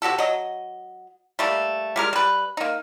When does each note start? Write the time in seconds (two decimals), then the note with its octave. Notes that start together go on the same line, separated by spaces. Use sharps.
0.02 C3 F#4 G4 A4
0.18 F#3 D#5
1.39 G3 A3 A#3
1.96 G3 G#3 A#4
2.13 G3 B4
2.57 A#3 D#4